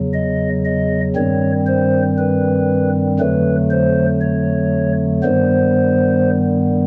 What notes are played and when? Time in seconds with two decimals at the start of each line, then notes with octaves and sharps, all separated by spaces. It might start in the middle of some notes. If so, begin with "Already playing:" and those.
Already playing: E2 C#3 F#3
0.14 D#5
0.65 D#5
1.16 G2 D#3 G3 C4 C#5
1.66 C5
2.18 B4
3.19 F2 D3 F#3 A3 B4
3.70 C5
4.21 C#5
5.22 G2 D#3 G3 B3 C5